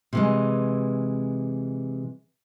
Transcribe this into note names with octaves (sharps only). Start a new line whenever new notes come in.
C3 E3 G#3